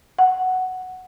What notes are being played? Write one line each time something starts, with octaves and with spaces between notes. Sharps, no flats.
F#5